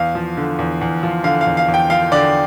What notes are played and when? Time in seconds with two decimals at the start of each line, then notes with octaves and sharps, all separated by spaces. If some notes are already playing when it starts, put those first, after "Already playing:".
Already playing: E2 F5
0.15 F3
0.37 D3
0.59 E2
0.81 E2
1.03 F3
1.24 D3 F5
1.41 F5
1.46 E2
1.57 F5
1.68 E2
1.74 G5
1.90 F3 F5
2.12 D3 D5